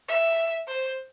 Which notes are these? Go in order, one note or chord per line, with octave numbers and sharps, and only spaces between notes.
E5
C5